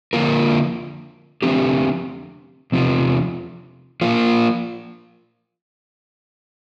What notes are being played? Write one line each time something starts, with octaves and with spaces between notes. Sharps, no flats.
D3 F3 A#3 F4 A#4
D3 F3 A3 C4 G4
E2 C3 F3
F3 A#3 F4